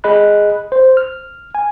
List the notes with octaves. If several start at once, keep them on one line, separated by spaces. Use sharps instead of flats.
G#4 D#5 B5 F#6
C5
F6
G#5